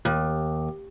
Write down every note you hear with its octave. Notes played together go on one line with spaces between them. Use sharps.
D#2